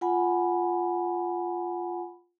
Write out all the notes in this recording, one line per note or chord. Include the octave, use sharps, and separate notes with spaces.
F4 F#5 G#5 B5